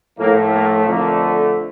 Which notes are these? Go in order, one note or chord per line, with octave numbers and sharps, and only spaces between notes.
A2 F3 A3 A#3
A#3
F2 D3 A3 A#3